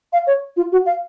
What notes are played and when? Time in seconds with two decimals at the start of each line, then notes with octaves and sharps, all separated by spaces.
0.13 F5
0.27 C#5
0.57 F4
0.72 F#4
0.86 F5